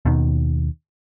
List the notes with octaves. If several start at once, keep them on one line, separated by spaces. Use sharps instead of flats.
D#2 B2 D#3